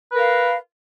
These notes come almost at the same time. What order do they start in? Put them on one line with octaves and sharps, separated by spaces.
B4 A#4 F5